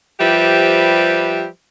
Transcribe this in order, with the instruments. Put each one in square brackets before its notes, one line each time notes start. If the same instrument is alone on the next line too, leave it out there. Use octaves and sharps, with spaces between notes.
[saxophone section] F3 G3 G4 B4 C5 E5